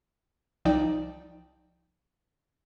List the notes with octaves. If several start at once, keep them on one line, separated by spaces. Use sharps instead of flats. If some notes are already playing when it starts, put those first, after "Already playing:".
C2 F3 D#4 D5 G5